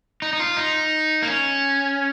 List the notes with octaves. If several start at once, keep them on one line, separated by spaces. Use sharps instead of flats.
D#4
D#4
F4
D#4
A#3
C#4